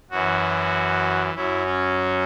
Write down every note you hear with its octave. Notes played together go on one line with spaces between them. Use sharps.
F#2 E3 F#4
F#2 F#3 E4
C#4